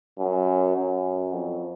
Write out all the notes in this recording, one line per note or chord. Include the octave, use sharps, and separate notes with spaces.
F#2
F#2
F2